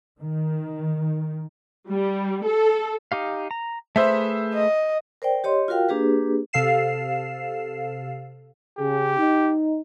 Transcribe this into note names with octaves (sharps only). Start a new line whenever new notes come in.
D#3
G3
A4
D#4 G4 F5
A#5
A3 G#4 B4 C5 E5
D#5
A#4 C5 D5 G5
G4 C#5 D#5 C6
F4 F#4 A#4 F5 G5
A#3 D4 G4 G#4 B4
C3 A4 F5 C7 E7
C#3 G4 G#4
D#4